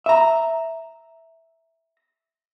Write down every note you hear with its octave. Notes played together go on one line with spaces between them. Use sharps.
E5 A#5